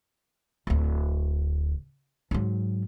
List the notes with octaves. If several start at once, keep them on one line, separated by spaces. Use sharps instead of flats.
D1 D2
G#2 F#3